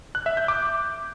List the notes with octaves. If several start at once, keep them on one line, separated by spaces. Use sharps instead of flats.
F#6
E5
G6
D6